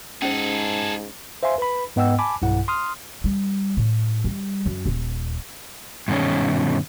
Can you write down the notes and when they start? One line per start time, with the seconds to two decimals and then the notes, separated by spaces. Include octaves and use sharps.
0.22 G#2 C#4 G#4 A4 C5
1.43 C5 E5 F5 G#5 C6
1.58 B4 B5
1.96 G#2 B3 D#5 F#5 G5 E6
2.19 G#5 A5 B5 D6
2.42 B1 G2 E4 F#5
2.68 C6 D#6 F6
3.24 G3
3.77 A2
4.24 G3
4.66 F#2
4.86 D#1
6.08 G2 B2 D#3 C#4